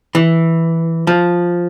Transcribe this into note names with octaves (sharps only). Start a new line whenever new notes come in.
E3
F3